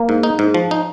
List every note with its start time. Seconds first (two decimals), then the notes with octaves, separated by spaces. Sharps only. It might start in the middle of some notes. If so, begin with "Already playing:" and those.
Already playing: A#3
0.09 G#2
0.23 D#4
0.39 G#2
0.54 F3
0.71 D#4